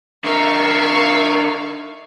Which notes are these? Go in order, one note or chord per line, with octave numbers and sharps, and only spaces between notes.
D3 A#4 E5 F5 C#6